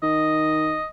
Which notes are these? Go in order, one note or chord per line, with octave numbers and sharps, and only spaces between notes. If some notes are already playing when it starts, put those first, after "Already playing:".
D#3 D#5